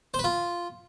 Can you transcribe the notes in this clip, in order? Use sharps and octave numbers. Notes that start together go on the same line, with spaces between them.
C5
B4
F4